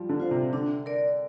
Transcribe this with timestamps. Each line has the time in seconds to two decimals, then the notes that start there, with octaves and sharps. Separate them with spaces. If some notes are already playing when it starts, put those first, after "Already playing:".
Already playing: F3 G3
0.09 D3
0.20 F4 C5 F5
0.31 C3
0.53 D3 D4
0.86 A#4 D5